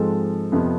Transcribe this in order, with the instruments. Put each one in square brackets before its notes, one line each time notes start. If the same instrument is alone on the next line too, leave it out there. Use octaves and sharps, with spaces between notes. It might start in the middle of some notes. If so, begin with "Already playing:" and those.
Already playing: [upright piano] G#2 F3 G#3 C4 A4
F2 C3 F3 B3